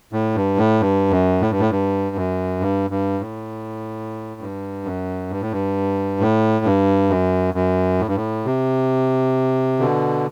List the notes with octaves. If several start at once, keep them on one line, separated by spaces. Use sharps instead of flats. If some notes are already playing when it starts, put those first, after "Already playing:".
A2
G2
A2
G2
F#2
A2
G2
A2
G2
F#2
G2
G2
A2
G2
F#2
G2
A2
G2
A2
G2
F#2
F#2
A2
G2
A2
C3
B2 D3